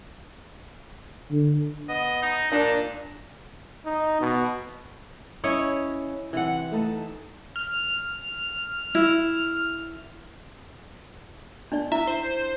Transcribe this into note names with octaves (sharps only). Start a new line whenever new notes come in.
D3
B3 D#5
D#4
A#2 D4 D#4
D#4
B2
C#4 E4 C#5 D#5
C3 E3 F#5
A3 D#4 A5
F6
E4
D4 D#4 D5
E4 E5
C5